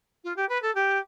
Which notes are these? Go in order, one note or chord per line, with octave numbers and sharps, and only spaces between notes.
F4
G4
B4
A4
G4